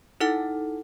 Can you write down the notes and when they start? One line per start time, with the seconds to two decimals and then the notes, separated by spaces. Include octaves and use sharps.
0.20 D#4 E4 A4 F#5 F6